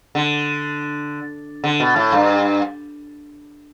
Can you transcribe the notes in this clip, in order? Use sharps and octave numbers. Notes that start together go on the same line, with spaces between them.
D3
D3
B2
A2
G2